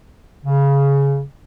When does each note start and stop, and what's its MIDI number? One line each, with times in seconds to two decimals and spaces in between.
0.44 1.22 49